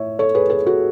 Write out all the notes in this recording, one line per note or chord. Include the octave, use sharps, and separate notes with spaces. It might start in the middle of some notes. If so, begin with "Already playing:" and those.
Already playing: A2 C#5 E5
A4 C#5
G#4 B4
G#4 B4
F#4 A4